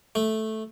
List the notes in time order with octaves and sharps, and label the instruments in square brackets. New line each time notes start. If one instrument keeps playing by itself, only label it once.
[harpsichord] A3